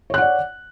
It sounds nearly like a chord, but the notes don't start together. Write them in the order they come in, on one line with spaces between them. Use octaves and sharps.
C#5 F#6 F#5 D5